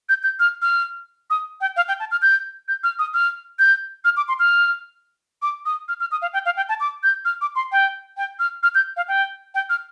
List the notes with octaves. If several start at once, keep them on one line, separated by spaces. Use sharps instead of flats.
G6
G6
F6
F6
D#6
G5
F5
G5
A5
F6
G6
G6
F6
D#6
F6
G6
F6
D6
C6
F6
D6
D#6
F6
F6
D#6
F5
G5
F5
G5
A5
D6
G6
F6
D6
C6
G5
G5
F6
F6
G6
F5
G5
G5
F6